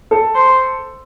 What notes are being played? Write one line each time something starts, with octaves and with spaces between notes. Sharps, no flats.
A4
C5